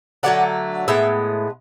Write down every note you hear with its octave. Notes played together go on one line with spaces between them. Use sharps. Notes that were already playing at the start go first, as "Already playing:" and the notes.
D3 F#3 A3 D5 F#5
A2 G#3 B3 E5